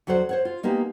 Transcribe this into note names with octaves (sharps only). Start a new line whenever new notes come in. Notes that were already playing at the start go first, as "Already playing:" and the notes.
D2 F#3 A4 C5 F#5
C5 C#5 F#5
F4
G#3 A#3 B3 D#4 G4